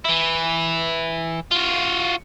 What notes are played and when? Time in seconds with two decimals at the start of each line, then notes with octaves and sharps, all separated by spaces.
0.05 E3 E4
1.51 F4 F#4